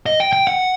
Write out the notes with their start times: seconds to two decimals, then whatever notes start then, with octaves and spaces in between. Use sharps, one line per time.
0.06 D#5
0.20 G5
0.33 G5
0.47 F#5